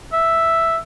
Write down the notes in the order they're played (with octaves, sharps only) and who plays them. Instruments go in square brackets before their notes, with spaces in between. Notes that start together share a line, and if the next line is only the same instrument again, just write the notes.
[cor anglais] E5